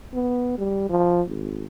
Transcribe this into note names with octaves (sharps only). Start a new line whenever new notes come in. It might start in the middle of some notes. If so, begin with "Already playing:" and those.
B3
G3
F3
G#1